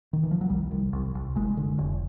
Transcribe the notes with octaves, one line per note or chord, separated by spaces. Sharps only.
D#3
E3
F3
F#3
C2 G3
C2
C2
C2
F#1 G#3
D3
F1